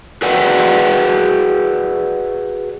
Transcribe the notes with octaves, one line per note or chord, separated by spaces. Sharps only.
F#4 G#4 B4 D5 F#5 G5